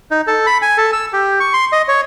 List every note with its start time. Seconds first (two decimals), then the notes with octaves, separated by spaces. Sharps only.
0.11 D#4
0.27 A4
0.46 B5
0.62 G#5
0.77 A4
0.93 E6
1.13 G4
1.40 C#6
1.54 C6
1.72 D#5
1.88 C#5